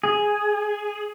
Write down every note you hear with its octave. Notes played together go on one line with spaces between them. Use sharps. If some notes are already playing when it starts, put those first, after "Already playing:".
G#4